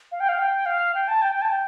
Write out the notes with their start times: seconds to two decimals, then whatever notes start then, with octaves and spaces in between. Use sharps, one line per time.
0.12 F5
0.20 G5
0.29 F5
0.39 G5
0.66 F5
0.95 G5
1.08 A5
1.22 G5
1.35 G5
1.42 A5
1.50 G5